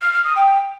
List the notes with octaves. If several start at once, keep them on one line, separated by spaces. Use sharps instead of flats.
F6
F6
D#6
G5